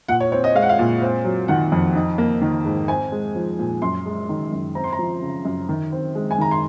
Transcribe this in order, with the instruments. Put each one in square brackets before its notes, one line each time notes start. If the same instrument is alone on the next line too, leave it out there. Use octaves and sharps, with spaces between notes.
[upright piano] A#2 F#5
C#5
C4 C#5
D#5
G#3 F5
F#5
F5
A#2
C4
F#3
D#3 F#5
F2
D#4
A#3
D#3
G#2
C4 G#5
G#3
F3
A#2
F#2 C6
G#3
D#3
F#2
C4 A#5
C6
A#5
F3
C#3
F#2
D#3
C4
G#3
G#5
D#3 A#5
C6